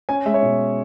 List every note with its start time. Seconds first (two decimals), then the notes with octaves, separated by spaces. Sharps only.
0.09 C#4 G#5
0.25 G#3 E5
0.34 C#5
0.42 B2